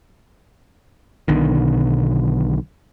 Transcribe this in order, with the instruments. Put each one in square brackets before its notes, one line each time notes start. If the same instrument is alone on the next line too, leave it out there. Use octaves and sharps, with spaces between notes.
[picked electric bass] B1 B2 D3 D#3